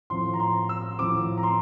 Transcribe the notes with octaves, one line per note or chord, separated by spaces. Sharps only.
A2 F3 C4 C6
A#5
C6
E6
A2 F3 C4 D6
A#5
C6